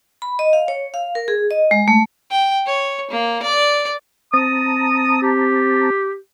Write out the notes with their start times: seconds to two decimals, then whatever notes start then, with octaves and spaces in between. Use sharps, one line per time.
0.22 B5
0.39 D#5
0.53 F5
0.68 C#5
0.94 F5
1.15 A#4
1.28 G#4
1.51 D#5
1.71 G#3
1.88 A3
2.31 G5
2.67 C#5
3.11 A#3
3.42 D5
4.34 C4 A5 A#5 D#6
5.22 G4